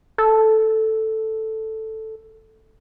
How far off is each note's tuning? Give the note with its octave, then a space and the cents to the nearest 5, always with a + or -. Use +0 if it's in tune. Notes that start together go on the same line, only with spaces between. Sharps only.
A4 +0